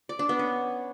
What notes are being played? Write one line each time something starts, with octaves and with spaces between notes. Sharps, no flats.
D5
D4
B3
C#4